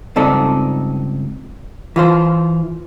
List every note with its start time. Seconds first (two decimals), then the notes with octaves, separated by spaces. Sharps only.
0.16 C#2 G2 C4 D#4 A4 D5
1.96 E3 F4 C5